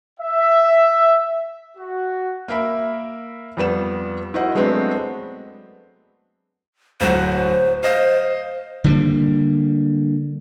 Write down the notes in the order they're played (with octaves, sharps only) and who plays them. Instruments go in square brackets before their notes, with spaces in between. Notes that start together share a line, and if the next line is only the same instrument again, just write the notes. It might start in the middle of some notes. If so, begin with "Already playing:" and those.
[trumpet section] E5
F#4
[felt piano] A#3 A#4 E5 B5
F2 G3 B3 E7
E4 F#4 A#4 C5 D#5 F#5
F#3 G#3 A3 B3 C4 D4
[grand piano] D1 F#3 F#4 [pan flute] C5
[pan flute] C5 [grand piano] D#5 F5
[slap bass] D3 G3 G#3 A#3